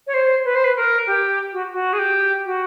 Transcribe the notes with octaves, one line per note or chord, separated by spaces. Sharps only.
C#5
C5
B4
C5
B4
A#4
G4
F#4
F#4
G#4
G4
F#4